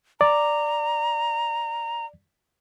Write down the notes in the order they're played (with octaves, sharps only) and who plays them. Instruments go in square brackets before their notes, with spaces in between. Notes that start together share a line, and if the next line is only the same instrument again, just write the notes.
[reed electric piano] D5 [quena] A#5